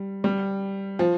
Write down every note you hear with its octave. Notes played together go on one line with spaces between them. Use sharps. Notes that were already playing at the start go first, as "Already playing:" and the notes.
Already playing: G3
G3
F3